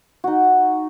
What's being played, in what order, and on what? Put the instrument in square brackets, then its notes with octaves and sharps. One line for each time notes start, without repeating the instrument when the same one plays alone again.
[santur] D#4 F#4